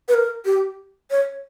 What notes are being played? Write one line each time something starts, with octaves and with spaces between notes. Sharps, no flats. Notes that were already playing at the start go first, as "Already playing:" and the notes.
B4
A#4
G4
C#5